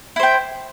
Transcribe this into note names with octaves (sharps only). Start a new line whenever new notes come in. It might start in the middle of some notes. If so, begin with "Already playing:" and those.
E4 C5 G5